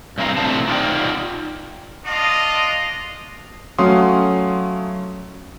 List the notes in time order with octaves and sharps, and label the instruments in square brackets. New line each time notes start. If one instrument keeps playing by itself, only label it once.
[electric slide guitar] G2 C3 E4 G#4 F5 A#5
A2 C3 A3 D4 C5 A5
D4 D#4 F4 D5 G5
[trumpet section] D4 F4 D#5
[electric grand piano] F#3 A3 C#4 F5 C6 D#6